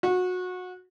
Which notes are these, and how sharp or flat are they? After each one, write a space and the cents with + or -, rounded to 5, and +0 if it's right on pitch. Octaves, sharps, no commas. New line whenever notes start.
F#4 -25